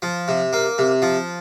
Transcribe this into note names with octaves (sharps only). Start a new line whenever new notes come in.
F3
C3
A#3
C3
F3